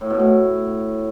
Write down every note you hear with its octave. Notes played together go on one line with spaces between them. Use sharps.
A2
B2
A2